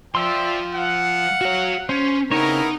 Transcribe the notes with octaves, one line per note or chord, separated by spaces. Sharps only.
F3 D5 E5 G5 C6 E6
F5 F#5
F#4 C#5
C#4 C5
C#3 B3 C4 D#4 E4 A#4 C#5